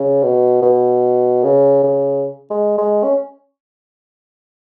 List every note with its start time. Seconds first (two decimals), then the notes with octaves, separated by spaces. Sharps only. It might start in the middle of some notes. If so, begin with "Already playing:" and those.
Already playing: C#3
0.23 B2
0.62 B2
1.44 C#3
1.83 C#3
2.51 G#3
2.78 G#3
3.04 C#4